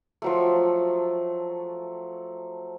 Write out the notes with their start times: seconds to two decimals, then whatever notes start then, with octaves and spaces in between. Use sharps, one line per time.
0.22 F3 F#3 A3